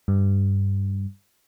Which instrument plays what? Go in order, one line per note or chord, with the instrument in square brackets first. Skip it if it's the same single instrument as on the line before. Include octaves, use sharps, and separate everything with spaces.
[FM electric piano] G2